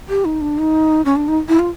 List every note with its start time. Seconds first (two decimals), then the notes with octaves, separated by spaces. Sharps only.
0.09 G4
0.25 D#4
0.41 D4
0.58 D#4
1.05 C#4
1.16 D4
1.28 D#4
1.48 E4
1.59 F4